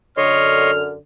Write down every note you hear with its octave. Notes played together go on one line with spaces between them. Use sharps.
F#2 D3 C#5 D#5 C6 F6